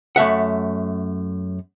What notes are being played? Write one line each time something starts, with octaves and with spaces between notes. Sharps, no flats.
F#2 A3 E5 F#5